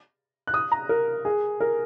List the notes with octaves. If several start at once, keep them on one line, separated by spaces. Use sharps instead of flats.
F#6
D#6
A#5
A#4
G#4
A#4